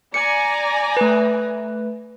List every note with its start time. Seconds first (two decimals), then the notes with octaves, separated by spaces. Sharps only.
0.14 D5 G#5 A#5 C#7
0.97 A3 B4